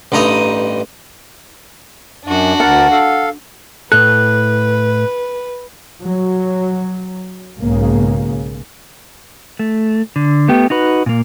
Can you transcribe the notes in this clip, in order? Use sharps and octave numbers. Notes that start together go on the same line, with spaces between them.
A1 G2 D#4 A#5 D#6
F#2 D4 F#4
D2 A#4 F#5 A5
A4 F5
A2 A4 B4 F#6
F#3
B1 G#2 C#3 A#3
A3
D3
A3 B3 G4
D#4 F#4 B4
A#2 A#3